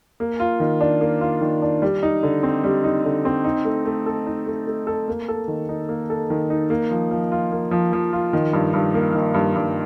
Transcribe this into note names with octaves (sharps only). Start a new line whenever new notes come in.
A#3
F4
D#3
D4
A#3
F4
D#3
D4
G3
D#4
D3
C4
G3
D#4
D3
C4
D#4
A3
A3
A4
D#4
A3
A3
A4
A#3
A4
D#3
D#4
A#3
A4
D#3
D#4
A#3
F3
F3
F4
A#3
F3
F3
F4
D#3
G2
G2
A#3
D#3
G2
G2